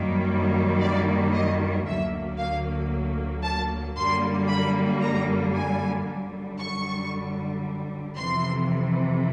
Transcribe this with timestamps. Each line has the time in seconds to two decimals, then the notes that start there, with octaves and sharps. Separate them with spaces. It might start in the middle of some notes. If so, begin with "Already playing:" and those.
Already playing: F#2 D#3 G3 A#3
0.80 D5
1.33 D#5
1.86 D2 D3 F#3 A#3 E5
2.38 F5
3.43 A5
3.96 F#2 D3 G3 A#3 C6
4.48 B5
5.02 A#5
5.54 G#5
6.07 F#2 D3 G3
6.60 C#6
8.17 F2 C3 E3 C6